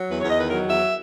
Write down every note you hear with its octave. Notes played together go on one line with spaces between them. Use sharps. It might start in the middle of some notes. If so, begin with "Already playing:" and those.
Already playing: F#3
E2 B4
C#5
E2
D#5
D#3 B4
F#3 A#4
E2 E5